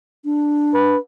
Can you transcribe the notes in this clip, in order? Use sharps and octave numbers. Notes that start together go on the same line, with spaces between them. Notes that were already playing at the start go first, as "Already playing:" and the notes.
D4
B4